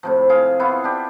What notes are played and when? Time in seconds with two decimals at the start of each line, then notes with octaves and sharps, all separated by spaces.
0.03 A2 C3 F3
0.29 F4 G#4 F5
0.60 B3 E4 F4 C#5
0.84 D4 G4